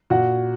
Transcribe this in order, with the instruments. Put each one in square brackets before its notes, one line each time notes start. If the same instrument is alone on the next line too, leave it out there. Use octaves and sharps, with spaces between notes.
[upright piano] A#2 F#4 F#5